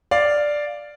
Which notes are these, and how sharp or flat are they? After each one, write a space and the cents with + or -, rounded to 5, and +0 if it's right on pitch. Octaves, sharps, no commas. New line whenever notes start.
D5 +0 F5 +0